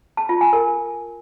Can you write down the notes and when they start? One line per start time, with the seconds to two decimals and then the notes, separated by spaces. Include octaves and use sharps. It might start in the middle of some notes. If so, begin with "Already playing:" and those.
0.17 A5
0.29 F4
0.41 G#5
0.53 A#4